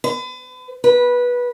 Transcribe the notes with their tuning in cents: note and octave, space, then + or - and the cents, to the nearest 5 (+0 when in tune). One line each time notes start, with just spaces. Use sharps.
B4 +40
B4 -15